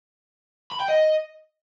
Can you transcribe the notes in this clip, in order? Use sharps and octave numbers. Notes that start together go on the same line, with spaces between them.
B5
G5
D#5